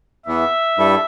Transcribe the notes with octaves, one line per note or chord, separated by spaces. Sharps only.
E2 E3 B3 E5
G2 G3 E4 A4